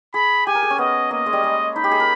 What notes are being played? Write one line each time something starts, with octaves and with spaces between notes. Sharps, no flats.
G#4 B5
G4 G#5
A#4
G#4
C#4
B3 D#5
A#3 D#5
G#3
G3
G#3
D#4 B5
G4
G#4
A#4